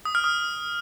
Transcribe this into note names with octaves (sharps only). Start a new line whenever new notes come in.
D#6
F6
D#6